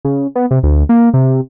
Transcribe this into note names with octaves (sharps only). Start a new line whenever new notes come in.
C#3
B3
C3
D2
A#3
C3